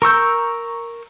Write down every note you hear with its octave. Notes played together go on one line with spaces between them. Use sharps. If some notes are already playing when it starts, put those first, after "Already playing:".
A#4 C#6 E6 G6